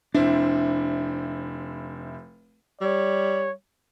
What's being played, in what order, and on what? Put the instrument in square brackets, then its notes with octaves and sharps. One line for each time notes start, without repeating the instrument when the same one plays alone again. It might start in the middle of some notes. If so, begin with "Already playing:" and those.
[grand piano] F1 C4 E4 [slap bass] D4
[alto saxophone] G3 [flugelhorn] C#5